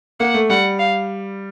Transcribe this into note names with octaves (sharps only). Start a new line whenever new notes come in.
A#3 F#5
A3
G3 F#5
F5